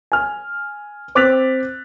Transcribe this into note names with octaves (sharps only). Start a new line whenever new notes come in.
G#5 F6
C4 D6 F#6 A6 B6 F7